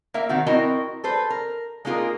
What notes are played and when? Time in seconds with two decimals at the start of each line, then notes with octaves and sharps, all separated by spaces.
0.14 A#3 A#4 E5
0.29 D#3 C4 F#4
0.47 C4 E4 F#4 A#4 D#5
1.04 A4 B4 C5
1.30 A#4
1.85 G#3 A#3 D#4 F4 G#4 A#4